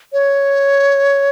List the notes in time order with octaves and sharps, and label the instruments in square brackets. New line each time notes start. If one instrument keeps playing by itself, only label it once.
[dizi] C#5